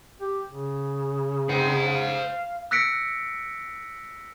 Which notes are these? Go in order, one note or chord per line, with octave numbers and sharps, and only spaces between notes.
G4
C#3
C4 C5 F#5
F5
E6 F#6 A#6 B6 C#7 D7